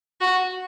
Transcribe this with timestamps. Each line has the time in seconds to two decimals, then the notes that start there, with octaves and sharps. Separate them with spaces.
0.21 F#4